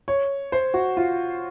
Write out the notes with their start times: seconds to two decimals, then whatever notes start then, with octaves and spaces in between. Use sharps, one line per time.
0.08 C#5
0.52 C5
0.74 F#4
0.97 F4